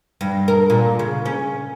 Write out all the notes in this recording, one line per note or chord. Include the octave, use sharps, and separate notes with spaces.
G2
A#4
A#2
C#3
C#4